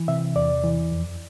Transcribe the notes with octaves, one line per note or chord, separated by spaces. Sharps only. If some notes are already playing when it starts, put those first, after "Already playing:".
Already playing: E3
C3 E5
E2 D5
E3
F2